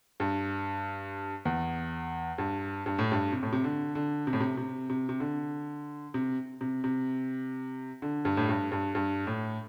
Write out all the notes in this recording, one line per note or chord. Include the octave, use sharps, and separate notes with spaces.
G2
E2
G2
G2
A2
G2
C3
A2
C3
D3
D3
C3
A2
C3
C3
C3
C3
D3
C3
C3
C3
D3
G2
A2
G2
G2
G2
A2